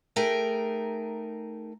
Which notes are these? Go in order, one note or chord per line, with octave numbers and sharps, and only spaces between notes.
A3 D#4 G#4 A#4 G5